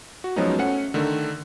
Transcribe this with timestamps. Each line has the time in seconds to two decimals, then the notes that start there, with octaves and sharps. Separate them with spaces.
0.24 F#4
0.36 F3 F#3 G#3 B3 C#4 D#4
0.58 A3 C#4 F#5 C#7
0.94 D3 D#3 A3